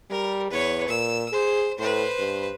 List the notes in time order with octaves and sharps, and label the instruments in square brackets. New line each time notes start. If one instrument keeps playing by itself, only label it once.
[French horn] G3 [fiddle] A#4
[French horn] E2 [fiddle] B4 C#5
[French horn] A#2 [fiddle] E6
[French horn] G#4 [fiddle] C5
[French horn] A2 [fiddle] B4 C5
[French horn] G2